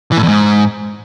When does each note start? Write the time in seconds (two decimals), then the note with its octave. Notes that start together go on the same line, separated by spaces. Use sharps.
0.12 E3
0.17 A2
0.23 E2
0.28 G#2